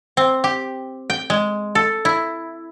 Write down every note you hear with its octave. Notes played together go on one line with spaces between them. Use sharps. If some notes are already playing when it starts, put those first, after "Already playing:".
C4
G4
G5
G#3
A4
E4